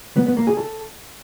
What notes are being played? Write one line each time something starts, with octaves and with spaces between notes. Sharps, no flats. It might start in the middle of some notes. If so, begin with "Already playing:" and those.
B3
B3
A#3
G#4
A4